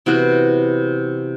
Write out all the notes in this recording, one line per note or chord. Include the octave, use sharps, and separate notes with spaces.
C3 E3 B3 F#4